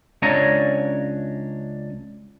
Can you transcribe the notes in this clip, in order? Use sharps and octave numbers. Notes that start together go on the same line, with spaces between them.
C#2 C#4 D4 C#5 G#5 A#5